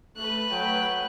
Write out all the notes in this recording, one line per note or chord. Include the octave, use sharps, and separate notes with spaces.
A3 B4 F#6
F#3 G5